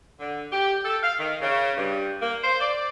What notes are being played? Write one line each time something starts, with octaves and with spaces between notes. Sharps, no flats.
D3
G4
A4
F5
D#3
C#3
G2
A#3
C5
D5